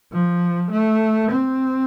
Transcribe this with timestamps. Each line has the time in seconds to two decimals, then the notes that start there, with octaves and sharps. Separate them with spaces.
0.12 F3
0.71 A3
1.31 C4